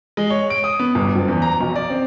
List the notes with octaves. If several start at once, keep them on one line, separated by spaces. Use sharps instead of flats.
G#3
C#5
D7
D#6
B3
G1
F#1
E2
A#5
B1
D5
C4